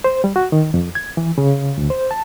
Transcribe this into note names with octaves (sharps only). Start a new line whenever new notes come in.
C5
G3
F#4
D#3
F2
G#6
E3
C#3
D2
C5
A5